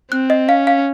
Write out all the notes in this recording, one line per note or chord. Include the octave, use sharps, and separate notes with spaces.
C4 F#6
D#5
C#4 F5
F5